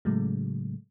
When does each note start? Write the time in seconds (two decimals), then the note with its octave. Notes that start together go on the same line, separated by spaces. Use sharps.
0.05 A2 C#3 F#3 G#3 A3